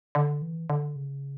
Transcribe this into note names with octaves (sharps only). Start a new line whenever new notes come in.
D3
E3
D3
C#3